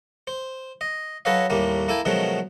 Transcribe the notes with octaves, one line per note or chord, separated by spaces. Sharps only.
C5
D#5
F#3 A4 B4 C#5 D#5 F5
D#2 A2 G3 A3 A#3
A#3 E4 A4 G5 G#5
B2 D#3 F3 F#3 G#3 A3